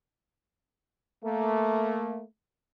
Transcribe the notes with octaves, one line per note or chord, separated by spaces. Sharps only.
A3 A#3